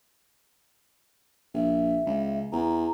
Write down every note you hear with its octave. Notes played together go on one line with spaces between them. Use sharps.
A#1 E5
C#2
E2 A#5